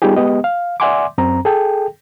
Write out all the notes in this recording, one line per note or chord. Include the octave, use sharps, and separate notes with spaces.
G3 B3 D#4 F4 G4 G#4
G#3 B3 G4 D#5
F5
D5 E5 F#5 G#5 C6 D6
F#2 C4 A#5
G#4 A4 G5